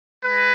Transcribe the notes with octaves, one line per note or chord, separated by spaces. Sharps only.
G#3 B4